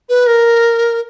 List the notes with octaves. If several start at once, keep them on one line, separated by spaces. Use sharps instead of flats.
B4
A#4